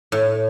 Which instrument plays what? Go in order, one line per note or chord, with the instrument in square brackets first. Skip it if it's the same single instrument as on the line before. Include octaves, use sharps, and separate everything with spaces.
[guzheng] A2